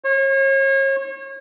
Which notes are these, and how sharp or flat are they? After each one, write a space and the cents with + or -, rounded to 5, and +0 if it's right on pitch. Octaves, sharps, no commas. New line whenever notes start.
C#5 -35